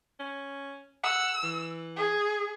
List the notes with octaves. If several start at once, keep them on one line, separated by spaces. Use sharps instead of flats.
C#4
F#5 E6
E3
G#4